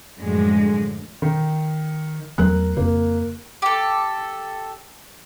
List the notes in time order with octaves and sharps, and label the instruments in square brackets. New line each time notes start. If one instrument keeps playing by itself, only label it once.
[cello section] F#2 A2 D3 F3 G#3
[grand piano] D#3
[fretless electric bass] E2 F#3 A3 [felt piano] A#4 F#6
[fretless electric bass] F2 C#3 [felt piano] A#3
[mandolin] G4 A4